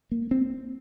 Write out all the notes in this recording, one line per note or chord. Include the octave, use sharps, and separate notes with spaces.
A#3
C4